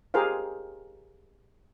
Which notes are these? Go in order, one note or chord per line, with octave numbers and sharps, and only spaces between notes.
G4 G#4 A#4 C5 F5